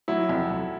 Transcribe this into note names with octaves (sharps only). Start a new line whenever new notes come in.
F#3 E4
F2
F2